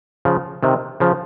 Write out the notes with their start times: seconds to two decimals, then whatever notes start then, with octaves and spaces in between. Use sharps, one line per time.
0.25 C#3 F3
0.63 C3 D#3
1.00 C#3 F3